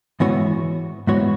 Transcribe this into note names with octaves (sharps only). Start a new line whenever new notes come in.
G#2 E3 B3 F#4 C#5
G#2 E3 B3 F#4 C#5